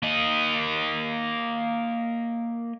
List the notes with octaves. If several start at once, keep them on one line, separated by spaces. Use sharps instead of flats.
A#3 D#5